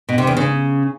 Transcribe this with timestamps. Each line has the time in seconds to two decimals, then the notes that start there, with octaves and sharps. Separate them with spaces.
0.09 B2
0.18 C3
0.27 E2
0.37 C#3